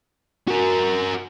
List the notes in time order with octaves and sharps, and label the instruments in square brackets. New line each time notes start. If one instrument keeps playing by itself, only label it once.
[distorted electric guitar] F#4 A#4